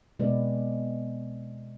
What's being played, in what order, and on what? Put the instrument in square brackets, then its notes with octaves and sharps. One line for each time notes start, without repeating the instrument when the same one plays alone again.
[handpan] B2 G#3 B3 C4 B4 D5